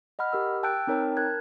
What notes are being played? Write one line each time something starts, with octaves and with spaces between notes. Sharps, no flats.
D#5 F#5 B5 F6
G4 A#4 E6
G5 A5 E6 F#6 G6 D7
C4 D#4 A#4 C#5 G5 A5
A#4 A5 F#6 G#6